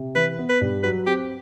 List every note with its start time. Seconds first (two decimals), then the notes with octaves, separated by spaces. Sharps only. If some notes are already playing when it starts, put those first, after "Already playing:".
Already playing: C3
0.15 E3 B4
0.39 B3
0.49 B4
0.61 G2
0.83 F#3 B4
1.06 C4 G4